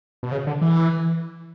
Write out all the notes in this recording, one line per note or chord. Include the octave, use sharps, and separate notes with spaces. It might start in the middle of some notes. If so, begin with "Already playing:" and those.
B2
C#3
D3
E3